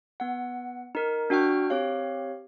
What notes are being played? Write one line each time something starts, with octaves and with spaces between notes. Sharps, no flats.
B3 F#5
D#4 A#4
D4 F#4 G5 C#6 F6 G6
C4 G4 C#5 F5